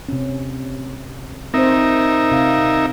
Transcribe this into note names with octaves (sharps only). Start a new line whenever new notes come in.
C3 C#4
C4 D#4 A#4 C5 E5
C3 F5